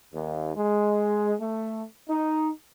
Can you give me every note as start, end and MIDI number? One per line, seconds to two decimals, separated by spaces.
0.13 0.51 39
0.56 1.34 56
1.40 1.83 57
2.08 2.49 63